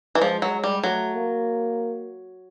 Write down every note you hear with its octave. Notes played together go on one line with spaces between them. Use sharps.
E3
F3 G#3
F#3
G3
F#3 A3
A#3